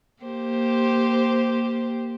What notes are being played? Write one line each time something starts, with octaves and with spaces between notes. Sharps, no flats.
A#3 G4 C5